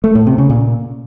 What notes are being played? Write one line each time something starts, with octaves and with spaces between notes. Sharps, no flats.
A3
A2
C3
C#3
A#2